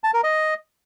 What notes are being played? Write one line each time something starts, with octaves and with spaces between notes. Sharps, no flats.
A5
A#4
D#5